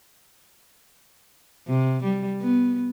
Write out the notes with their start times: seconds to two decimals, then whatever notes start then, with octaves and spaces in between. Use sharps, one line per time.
1.67 C3
2.03 G3
2.41 B3